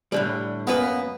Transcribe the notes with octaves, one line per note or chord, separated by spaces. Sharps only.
A2 D3 G3
F#2 A#3 B3 B4